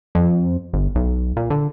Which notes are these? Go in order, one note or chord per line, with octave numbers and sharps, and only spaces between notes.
F2
G1
B1
A#2
D3